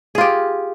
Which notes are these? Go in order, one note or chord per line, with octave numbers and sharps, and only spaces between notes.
F4 G4 G#4